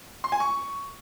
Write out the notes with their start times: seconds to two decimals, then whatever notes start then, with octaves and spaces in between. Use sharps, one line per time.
0.24 C6
0.32 G#5
0.40 C#6